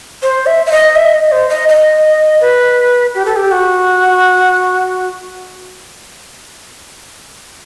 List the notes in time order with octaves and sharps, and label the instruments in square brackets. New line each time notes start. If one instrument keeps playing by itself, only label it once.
[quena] C5
E5
E5
D#5
E5
D#5
C5
D#5
D#5
B4
G4
A4
G4
F#4